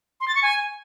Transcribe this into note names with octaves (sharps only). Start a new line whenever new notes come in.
C6
A6
C#6
G#5